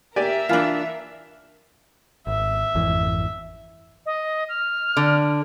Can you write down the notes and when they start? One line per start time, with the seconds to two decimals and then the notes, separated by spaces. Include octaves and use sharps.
0.16 G4 A#4 D5 E5 G#5
0.49 E3 D4 F4 F5
2.27 G#1 E5
2.75 G#1 F2 E3
4.06 D#5
4.49 F6
4.97 D3